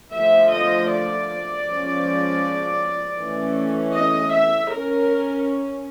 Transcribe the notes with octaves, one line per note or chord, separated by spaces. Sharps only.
D3 F3 A3 E5
D#5
D5
F3 G#3 C#4
E3 A3 C#4
D#5
E5
C#4 A#4